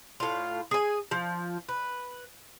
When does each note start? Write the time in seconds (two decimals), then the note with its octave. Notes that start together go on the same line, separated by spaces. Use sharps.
0.20 A2 F4
0.71 G#4 G#5
1.11 F3
1.69 B4